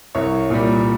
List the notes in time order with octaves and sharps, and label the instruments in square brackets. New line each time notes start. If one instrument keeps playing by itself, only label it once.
[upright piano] C2 C#5
A#2 G3